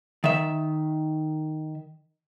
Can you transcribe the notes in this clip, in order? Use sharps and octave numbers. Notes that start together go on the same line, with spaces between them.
D#3 E5